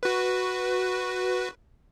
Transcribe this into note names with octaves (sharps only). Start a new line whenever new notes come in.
F#4 B4